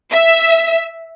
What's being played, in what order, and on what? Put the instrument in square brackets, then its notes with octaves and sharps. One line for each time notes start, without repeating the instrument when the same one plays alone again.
[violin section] E5